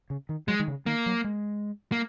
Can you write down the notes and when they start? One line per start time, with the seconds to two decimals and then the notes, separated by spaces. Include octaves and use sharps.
0.10 C#3
0.29 D#3
0.48 F#3 G#3
0.59 D#3
0.68 C#3
0.86 D#3 A#3
1.06 F#3
1.24 G#3
1.92 A#3